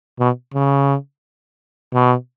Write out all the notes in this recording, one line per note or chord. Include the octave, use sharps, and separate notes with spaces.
B2
C#3
B2